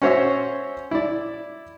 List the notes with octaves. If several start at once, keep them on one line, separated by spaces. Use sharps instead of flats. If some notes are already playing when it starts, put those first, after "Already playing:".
C#4 F#4 C5 C#5 E5
E4 D5